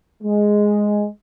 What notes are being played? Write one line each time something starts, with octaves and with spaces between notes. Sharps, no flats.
G#3